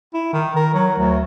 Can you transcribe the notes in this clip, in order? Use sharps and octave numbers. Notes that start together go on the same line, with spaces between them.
E4
D#3
A#4
F#3
D2